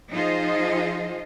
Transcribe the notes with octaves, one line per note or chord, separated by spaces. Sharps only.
F3 D#4 F4 G#4 C5 D#5